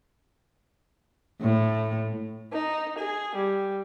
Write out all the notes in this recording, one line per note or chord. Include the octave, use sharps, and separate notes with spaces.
A2
D#4
G#4
G3